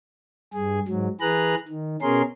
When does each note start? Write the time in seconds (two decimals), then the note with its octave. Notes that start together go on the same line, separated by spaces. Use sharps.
0.53 G2 G#4
0.88 G#2 F#3
1.21 E3 G#4 B4 A#5 F#6
1.68 D#3
2.02 B2 C#4 G#4 A#4 C6